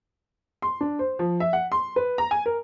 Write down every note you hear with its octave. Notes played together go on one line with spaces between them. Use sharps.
C6
D4
C5
F3
E5
F#5
C6
B4
A#5
G#5
A#4